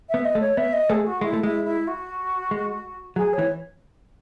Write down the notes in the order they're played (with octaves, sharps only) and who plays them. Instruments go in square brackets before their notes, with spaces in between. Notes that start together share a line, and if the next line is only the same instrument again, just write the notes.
[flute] E5
[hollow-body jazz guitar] B3
[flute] D#5
[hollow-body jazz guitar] A3
[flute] C#5
[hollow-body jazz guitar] B3 [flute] E5
[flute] D#5
[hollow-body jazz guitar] A3 [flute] G#4
[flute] F#4
[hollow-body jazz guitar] G#3 [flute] E4
[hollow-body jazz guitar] A3
[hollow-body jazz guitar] G#3 [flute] E4
[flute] E4
F#4
[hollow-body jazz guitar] G#3
[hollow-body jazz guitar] F#3 [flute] G#4
[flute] C#5
[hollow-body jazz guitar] E3